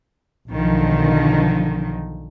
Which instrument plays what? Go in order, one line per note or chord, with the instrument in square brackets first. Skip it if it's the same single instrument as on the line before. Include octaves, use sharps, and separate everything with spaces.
[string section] B1 D3 D#3 F3